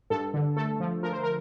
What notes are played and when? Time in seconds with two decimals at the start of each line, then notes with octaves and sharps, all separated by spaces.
0.10 G2 A4
0.34 D3
0.56 A3 A4
0.80 F3
1.03 F3 A#4
1.13 C5
1.23 A#4